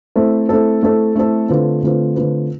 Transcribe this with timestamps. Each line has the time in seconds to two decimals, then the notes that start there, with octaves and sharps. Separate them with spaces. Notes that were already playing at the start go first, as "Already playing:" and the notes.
0.16 A3 C4 E4 A4
0.49 A3 C4 E4 A4
0.83 A3 C4 E4 A4
1.16 A3 C4 E4 A4
1.49 D3 A3 C4 F4 B4
1.83 D3 A3 C4 F4 B4
2.16 D3 A3 C4 F4 B4